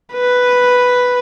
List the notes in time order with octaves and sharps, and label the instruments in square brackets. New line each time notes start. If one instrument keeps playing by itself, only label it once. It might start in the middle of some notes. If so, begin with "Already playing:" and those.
[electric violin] B4